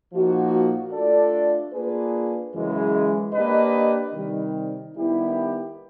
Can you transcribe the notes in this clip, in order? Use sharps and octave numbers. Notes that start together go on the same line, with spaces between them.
A#2 F3 A#3 D#4 F#4
A3 D4 F4 A4 D5
A#3 D4 F4 G#4 B4
F#2 C#3 E3 G#3
A#3 D4 G4 B4 D#5
C3 D#3 G3
D#3 G3 B3 E4 G4